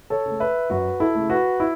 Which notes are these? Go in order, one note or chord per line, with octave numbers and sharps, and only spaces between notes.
A4 C#5
C#3 A3
B4 E5
F#2 F#4 B4
E4 A4
C#3 A3
F#4 B4
E4